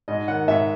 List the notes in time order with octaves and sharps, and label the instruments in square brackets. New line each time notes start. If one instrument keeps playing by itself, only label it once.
[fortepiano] G#2 D#5
D#3 F#5
G#2 E5